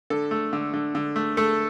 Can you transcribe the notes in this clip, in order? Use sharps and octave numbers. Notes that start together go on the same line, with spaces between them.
D3 A4
A3
D3
D3
D3
A3
A3 A4